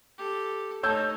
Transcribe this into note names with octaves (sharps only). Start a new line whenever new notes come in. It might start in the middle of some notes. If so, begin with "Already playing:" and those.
G4 A4
A3 D#4 C#5 A5 E6 G6